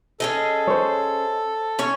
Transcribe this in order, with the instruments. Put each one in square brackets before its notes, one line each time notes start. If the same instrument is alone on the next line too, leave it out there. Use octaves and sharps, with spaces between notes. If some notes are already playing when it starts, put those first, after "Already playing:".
[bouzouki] C#4 G#4 D#5 [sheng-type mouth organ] A4
[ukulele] C5 C#5
[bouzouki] C#4 C#5